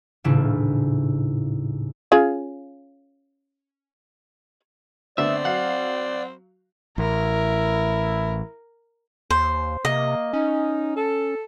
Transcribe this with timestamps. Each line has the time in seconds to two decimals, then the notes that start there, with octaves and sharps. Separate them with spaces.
0.24 D#1 A2 C#3 D4 E4 F4
2.12 C#4 F4 G#4
5.18 D3 A3 B3 C4 D5 E5
5.45 F#3 F5 F#5
6.98 A1 E4 A#4
9.30 D#2 C5
9.85 C3 A#3 D#5
10.33 C#4 D#4
10.95 A4